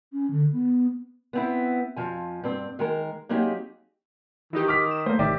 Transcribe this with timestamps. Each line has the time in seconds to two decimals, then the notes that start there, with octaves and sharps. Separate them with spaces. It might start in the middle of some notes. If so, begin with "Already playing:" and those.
0.12 C#4
0.30 D3
0.52 B3
1.33 B3 C4 E4
1.96 F2 F3 G#5
2.44 G2 C4
2.79 D#3 G#3 A#4
3.29 F#3 A#3 C4 D#4 G4 G#4
4.53 D#3 E3 D#4 G4
4.68 D6 F6 B6
4.91 E7
5.06 A3 A#3 C5
5.19 A1 C3 D#3 G4 D5 E5